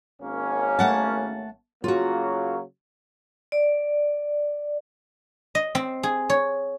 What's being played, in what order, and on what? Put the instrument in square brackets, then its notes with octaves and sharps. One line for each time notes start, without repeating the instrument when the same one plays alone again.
[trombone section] G#1 A#3 C#4
[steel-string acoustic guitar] A3 F#5 A5
[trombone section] C#3 F#3 A#3 [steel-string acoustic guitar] F4 F#4
[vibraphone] D5
[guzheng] D#5
C4
G#4
C#5